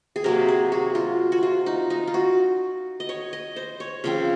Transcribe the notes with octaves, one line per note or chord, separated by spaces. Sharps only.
G#4
C3 F#3 A#3 A#4
G#4
F#4
F4
F#4
F4
D#4
D#4
F4
F#4
D#5
C#5
D#5
C5
C#5
C#3 F3 C4